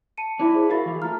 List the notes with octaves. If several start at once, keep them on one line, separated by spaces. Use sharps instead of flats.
A5 C#7 D#7
D4 E4 E5
G#4 C5
F#4 A#4 E5 F5 B5 A6
E3 G#4 F5
A3 F4 A#5 F6